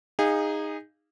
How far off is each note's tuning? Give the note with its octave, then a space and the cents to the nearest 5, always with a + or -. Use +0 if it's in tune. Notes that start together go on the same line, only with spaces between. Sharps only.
D#4 +0 G#4 -25 F5 -15